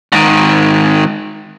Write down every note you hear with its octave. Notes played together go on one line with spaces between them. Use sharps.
G#2 D#3